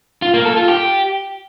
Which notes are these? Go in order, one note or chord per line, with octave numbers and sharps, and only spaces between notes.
F4
A#3
A4
F4
G4